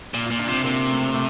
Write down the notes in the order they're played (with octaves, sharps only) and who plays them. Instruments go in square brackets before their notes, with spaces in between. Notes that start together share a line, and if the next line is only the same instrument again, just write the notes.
[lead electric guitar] A#2 [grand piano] F4
[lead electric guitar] A#2 [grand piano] F4
[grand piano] D4
[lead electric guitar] C3 [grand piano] C4
[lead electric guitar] C3 [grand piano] A#3
[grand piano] A3
A3